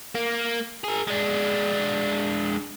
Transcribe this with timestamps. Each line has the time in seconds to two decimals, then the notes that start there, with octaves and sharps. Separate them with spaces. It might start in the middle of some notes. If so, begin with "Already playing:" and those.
0.15 A#3
0.84 G#4 A#4
1.07 G#3 D4